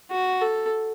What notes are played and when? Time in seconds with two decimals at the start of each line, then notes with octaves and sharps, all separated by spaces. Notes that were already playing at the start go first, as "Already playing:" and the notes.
0.11 F#4
0.41 A4